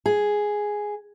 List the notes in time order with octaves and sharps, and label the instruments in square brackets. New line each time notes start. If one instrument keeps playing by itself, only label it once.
[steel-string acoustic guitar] G#4